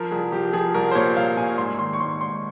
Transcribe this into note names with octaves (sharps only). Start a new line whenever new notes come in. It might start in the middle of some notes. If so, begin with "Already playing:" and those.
Already playing: F3 A#4
C2 G#4
F3 G4
F3 G#4
C2 A#4
C5
A#2 C#5
C2 F5
A#2 G#5
G#2 C6
D#3 C6
C#6
G#2 C6
G#2 C6